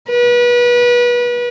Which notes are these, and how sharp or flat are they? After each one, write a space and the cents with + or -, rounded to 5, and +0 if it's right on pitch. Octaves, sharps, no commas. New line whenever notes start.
B4 -30